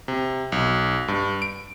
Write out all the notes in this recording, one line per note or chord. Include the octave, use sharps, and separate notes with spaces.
C3
B1
G2
D7